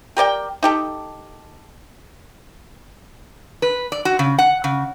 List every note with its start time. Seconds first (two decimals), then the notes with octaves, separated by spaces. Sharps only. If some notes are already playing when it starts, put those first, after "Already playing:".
0.17 G4 A#4 D5 G5
0.63 D#4 G4 A4
3.62 B4
3.92 D5
4.05 F#4
4.19 C#3
4.38 F#5
4.64 C#3